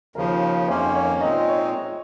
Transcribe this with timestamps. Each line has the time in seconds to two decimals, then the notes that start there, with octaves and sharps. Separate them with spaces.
0.15 D#2 C#3 F3 A#4
0.68 F2 D#3 A#3 C#4 C5
0.95 C#5
1.21 A#2 G#3 C4 D#4 D#5
1.48 C#5